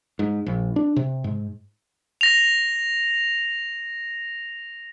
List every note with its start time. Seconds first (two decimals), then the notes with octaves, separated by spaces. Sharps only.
0.19 G#2
0.46 A#1
0.76 D4
0.96 C3
1.24 G#2
2.21 A#6 F7